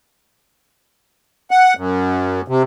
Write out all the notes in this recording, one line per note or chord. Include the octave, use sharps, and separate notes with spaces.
F#5
F#2
C3